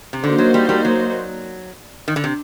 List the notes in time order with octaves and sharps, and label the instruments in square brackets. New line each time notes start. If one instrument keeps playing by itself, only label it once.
[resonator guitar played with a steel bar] C3
[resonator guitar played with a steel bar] D3 [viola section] A#3 D#4 F#4 C5
[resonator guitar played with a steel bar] F#3
G3
G3
F#3
D#3
D3
C3